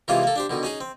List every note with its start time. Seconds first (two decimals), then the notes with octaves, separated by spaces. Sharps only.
0.08 C3 E3 G#3 A#3 C#4 F4
0.23 A#3 A4
0.36 D4 G4 C5
0.50 B2 D3 D#3
0.63 C#4 D#4 G#4
0.81 C4